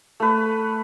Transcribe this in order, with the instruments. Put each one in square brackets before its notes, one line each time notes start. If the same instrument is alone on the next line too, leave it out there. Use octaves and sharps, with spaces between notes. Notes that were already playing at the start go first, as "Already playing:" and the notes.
[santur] A3 B4